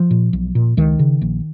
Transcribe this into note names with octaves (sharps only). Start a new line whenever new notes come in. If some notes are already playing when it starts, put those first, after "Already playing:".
Already playing: F3
A#2
B1
A#2
C#2 D#3
C#3
A#1